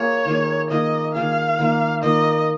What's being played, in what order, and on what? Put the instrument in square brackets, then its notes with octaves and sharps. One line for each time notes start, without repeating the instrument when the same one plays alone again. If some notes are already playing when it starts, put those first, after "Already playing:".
Already playing: [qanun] A#3 F4 G#4 [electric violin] C#5
[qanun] D#3 A#3 F4 G#4
[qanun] D#3 A#3 F4 G#4 [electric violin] D#5
[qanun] D#3 A#3 F4 G#4 [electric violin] F5
[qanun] D#3 A#3 F4
[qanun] D#3 A#3 F4 [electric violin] D#5